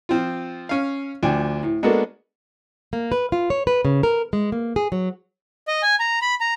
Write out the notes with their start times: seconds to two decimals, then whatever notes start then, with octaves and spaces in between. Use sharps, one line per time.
0.09 F3 C4 F4
0.69 C#4 F5
1.23 D2 F3 D4 G5 G#5
1.63 A2
1.83 G#3 A#3 B3 D4 F#4 A4
2.93 A#3
3.12 B4
3.32 F4
3.50 C#5
3.67 B4
3.85 C#3
4.03 A#4
4.33 G#3
4.52 A#3
4.76 G#4
4.92 F#3
5.68 D#5
5.83 G#5
6.00 A#5
6.22 B5
6.41 A#5